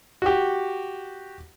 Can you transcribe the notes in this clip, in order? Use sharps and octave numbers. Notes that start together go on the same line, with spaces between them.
F#4 G4